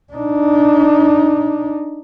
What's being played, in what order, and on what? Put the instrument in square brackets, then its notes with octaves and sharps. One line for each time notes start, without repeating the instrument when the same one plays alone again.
[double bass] D4 D#4